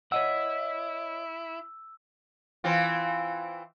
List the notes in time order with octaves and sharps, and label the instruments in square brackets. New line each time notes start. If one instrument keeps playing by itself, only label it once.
[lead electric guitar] E4 [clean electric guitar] C#5 D#5 F#5 [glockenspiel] E6
[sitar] E3 C4 F4